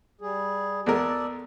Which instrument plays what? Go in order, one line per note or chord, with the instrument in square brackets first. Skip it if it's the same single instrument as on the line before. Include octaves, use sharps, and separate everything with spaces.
[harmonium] G3 G#4
[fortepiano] E2 G#3 A#4 [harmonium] A4 D5